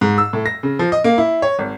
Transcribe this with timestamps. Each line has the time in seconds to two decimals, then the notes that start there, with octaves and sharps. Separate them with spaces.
0.01 G#2
0.18 E6
0.33 A2
0.46 A#6
0.63 C#3
0.79 F3
0.92 D#5
1.04 A#3
1.18 E4
1.42 C#5
1.59 G#1